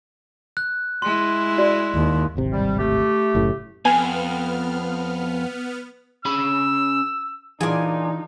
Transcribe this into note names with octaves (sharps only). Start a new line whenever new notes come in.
F#6
G#3 E4 C6
F#4 D5
D#2
D1 G#1 C3
G3
A3 G4
F#1 F#2 A2
F2 B3 G#5 F6
C#4 G#4 B5 E6
A#2 E3 D4 D#4 F4 G#4 G#5